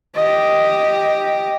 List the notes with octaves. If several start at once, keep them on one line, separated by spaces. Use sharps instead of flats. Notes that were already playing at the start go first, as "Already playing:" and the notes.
G4 D#5